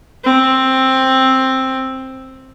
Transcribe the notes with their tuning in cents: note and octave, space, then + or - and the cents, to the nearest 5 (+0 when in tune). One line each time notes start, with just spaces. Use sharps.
C4 +10